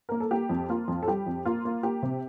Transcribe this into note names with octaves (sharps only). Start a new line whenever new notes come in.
A#3 A#4
A4
A#3 G4
F2
A#3 F4
F2
A4
G3 G4
F2
A#3 F4
A#3
A#3 G4
C3